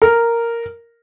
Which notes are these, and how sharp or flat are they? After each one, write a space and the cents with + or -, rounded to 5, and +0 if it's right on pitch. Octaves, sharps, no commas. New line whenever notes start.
A#4 -5